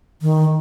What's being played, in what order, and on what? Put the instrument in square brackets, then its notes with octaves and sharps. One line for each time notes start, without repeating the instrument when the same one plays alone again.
[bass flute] D#3